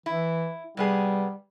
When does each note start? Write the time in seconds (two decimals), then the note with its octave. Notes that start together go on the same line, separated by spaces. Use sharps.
0.06 E3 E4
0.77 C3 G3 B3 G#4